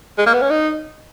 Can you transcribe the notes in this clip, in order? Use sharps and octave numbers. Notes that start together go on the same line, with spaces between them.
G#3
A#3
B3
C#4
D#4